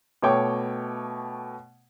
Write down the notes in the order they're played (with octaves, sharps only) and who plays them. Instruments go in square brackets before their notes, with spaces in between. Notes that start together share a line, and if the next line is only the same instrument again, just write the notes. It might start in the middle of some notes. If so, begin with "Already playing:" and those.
[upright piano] B2 A3 C#5 G5 D6